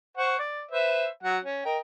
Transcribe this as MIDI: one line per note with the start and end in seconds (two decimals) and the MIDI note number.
0.17 0.36 72
0.17 0.36 78
0.17 0.36 85
0.39 0.64 74
0.71 1.07 71
0.71 1.07 72
0.71 1.07 76
1.23 1.38 54
1.23 1.38 78
1.44 1.60 61
1.65 1.78 70
1.65 1.78 75
1.65 1.78 79